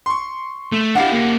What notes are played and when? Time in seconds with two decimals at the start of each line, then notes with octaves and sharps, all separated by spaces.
0.06 C6 C#6
0.72 A3
0.95 D4 E4 G4 F5 F#5
1.12 A#3 C#4